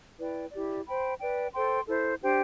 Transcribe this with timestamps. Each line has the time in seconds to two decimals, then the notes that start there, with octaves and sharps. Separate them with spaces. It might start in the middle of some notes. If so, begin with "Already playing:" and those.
0.19 E4 B4 D5 G5
0.52 E4 G4 D5
0.87 C5 G5 B5
1.20 B4 D5 G5
1.53 A4 C5 G5 C6
1.87 E4 A4 C5
2.21 D4 G4 C5 G5